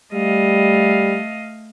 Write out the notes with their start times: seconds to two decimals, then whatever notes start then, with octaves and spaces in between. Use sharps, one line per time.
0.14 G3 A3 D#5 F5